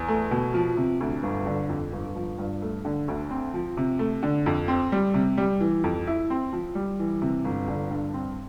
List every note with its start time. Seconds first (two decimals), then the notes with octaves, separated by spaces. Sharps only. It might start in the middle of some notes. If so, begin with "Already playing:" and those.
Already playing: E2
0.08 A3
0.31 B2
0.54 F3
0.77 C3
1.01 D2
1.23 G1
1.46 D3
1.69 F2
1.93 G1
2.15 F3
2.38 G2
2.62 A3
2.85 D3
3.08 D2
3.31 C4
3.54 F3
3.77 C3
3.99 A3
4.23 D3
4.46 F2
4.68 C4
4.92 G3
5.14 C3
5.38 G3
5.61 E3
5.84 F2
6.07 E4
6.30 C4
6.53 F3
6.75 G3
6.99 E3
7.22 C3
7.45 G1
7.68 D3
7.91 G2
8.14 C4